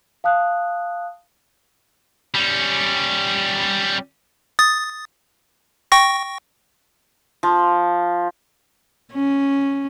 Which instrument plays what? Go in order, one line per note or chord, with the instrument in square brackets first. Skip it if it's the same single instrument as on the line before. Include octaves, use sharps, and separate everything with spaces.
[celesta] F5 A5 D#6 F#6
[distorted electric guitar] G3 C#4
[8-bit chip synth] D#6 A6
G5 C#6 A#6
[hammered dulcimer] F3
[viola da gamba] C#4